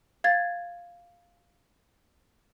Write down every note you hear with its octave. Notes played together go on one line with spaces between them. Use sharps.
F5 G#6 A6